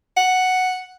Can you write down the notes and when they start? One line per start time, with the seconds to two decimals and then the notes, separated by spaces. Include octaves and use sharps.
0.17 F#5